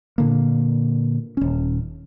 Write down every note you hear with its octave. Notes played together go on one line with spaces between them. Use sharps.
A#2 D3 A#3
D#1 C#4